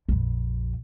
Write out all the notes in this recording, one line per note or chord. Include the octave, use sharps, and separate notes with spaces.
A#1 F2